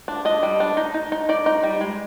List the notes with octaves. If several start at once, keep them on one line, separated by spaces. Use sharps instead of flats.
D4
D4 D#5
G3
D4
D#4
D#4
D#4
D#4 D5
D#4
G3
G#3